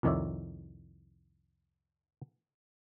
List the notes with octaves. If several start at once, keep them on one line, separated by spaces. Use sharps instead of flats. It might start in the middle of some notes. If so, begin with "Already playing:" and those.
C2 F2 D#3 C#5 D5 E5